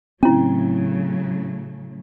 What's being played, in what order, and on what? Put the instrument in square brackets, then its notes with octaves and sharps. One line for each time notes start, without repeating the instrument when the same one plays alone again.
[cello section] A2 C#3 F#3 [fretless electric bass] C4 [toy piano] C#4 E4